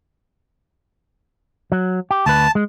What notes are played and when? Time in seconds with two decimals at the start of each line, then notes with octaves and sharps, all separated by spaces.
1.72 F#3
2.11 G4
2.26 D2 B4 A5
2.55 G#3